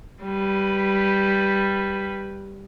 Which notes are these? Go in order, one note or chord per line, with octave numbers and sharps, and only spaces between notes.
G3 B4